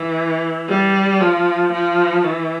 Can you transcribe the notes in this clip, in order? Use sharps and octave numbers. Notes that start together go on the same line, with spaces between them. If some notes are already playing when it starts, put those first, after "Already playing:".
Already playing: E3
G3
F3
F3
E3